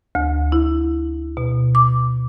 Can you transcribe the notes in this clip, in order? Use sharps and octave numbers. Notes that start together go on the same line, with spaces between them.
D2
E4
B2
D6